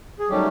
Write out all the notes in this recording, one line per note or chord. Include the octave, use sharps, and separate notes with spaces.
G#4
D#3 F#3 G3 A3 C#4 G4